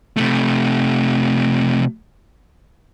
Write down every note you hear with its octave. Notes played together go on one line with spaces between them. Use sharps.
C3 A3